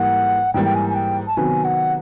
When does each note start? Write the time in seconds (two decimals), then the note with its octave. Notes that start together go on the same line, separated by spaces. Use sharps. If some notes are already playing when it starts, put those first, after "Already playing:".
Already playing: G#2 E3 G3 A#3 F#5
0.53 G#2 E3 G3 A#3 G5
0.65 G5
0.75 G#5
0.89 G#5
0.95 G5
1.27 A5
1.37 C3 D#3 F#3 B3 G#5
1.64 F#5